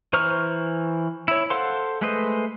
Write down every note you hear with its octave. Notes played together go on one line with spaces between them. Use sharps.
E3 C5 A#5 C#6 F6
E4 C#5
A4 C5 F5 F#5 C6
G#3 A3 B4 C5 D#5